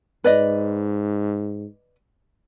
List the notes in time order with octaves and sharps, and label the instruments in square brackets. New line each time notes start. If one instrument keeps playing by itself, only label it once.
[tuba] G#2 [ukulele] B4 D5 D#5